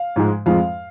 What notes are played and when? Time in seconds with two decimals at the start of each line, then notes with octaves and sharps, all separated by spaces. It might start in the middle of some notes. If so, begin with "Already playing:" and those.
Already playing: F5
0.16 G#2 F3 G#3
0.46 F2 F3 G#3 F5